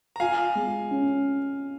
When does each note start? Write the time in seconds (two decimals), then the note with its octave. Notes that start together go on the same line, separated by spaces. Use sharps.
0.16 A#5
0.20 F4 F5 G#5
0.55 G#3
0.91 C#4